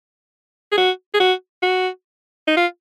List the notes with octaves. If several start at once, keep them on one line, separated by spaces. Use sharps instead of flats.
G#4
F#4
G#4
F#4
F#4
D#4
F4